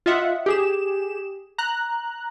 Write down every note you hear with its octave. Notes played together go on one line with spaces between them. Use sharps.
F4 D#5 E5 F#5
G4 G#4 E7
A#5 F#6